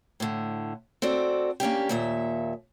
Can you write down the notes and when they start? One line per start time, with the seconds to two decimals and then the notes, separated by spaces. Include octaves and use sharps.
0.20 A2 D3
1.02 C4 F#4 A4 D5
1.60 A#3 C#4 D4 G4
1.89 D#2 A#2 E5